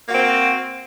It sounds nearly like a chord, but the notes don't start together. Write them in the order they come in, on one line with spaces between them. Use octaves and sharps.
A#3 F#4 C4 C5